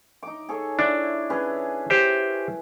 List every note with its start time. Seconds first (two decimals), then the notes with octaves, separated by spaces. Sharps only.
0.23 D#4 D6
0.49 G#4 A4 C#5
0.79 D4 E4
1.30 C#4 G#4 B4
1.90 G4 C5